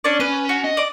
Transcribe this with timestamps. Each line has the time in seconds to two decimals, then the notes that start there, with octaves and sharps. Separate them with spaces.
0.04 C#4 D4 D5
0.20 C#4 B4
0.49 F#4
0.64 D#5
0.77 D5 D6